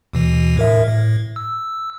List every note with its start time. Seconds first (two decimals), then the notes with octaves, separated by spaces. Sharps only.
0.13 D#2 B2 E3
0.57 A2 A#4 E5
0.87 A2
1.36 E6